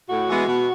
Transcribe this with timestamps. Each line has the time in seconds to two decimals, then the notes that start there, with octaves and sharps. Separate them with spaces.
0.09 A2 F#4
0.28 E3 G#3 B3
0.46 B2